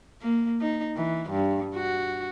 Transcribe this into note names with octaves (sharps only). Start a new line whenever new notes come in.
A#3
D#4
E3
G2
F#4